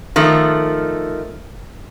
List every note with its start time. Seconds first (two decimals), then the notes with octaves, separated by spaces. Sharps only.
0.16 D#3 F3 A3